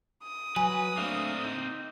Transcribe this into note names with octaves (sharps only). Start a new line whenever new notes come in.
D#6
F#3 B4 G#5
A3 A#3 C4 D4 F5
D#4